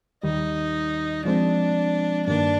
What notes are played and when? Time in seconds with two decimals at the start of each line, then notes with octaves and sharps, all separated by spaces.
0.23 D#2 D#3 G3 D#4
1.25 F3 G#3 C4 D4
2.27 G2 D#3 A#3 D4